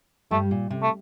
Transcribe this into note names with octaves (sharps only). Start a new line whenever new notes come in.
G2 G3 A3
A#2
C3
A3